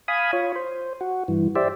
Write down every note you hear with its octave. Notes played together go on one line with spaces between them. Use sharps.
F5 G#5 B5 D#6
F4 C#5
C5
F#4
G2 E3
G4 C5 D5 E5